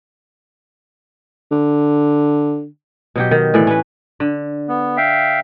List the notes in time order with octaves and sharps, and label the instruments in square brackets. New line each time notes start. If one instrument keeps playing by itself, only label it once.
[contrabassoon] D3
[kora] B2 F#3 G4
D#3
A2 E3 D5
C#4 B4
D3
[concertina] B3
E5 F5 G5